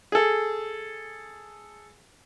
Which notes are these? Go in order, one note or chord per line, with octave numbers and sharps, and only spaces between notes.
G#4 A4